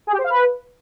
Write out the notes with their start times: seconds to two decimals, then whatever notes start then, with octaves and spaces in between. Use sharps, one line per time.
0.07 G#4
0.13 G4
0.18 C5
0.24 F5
0.30 B4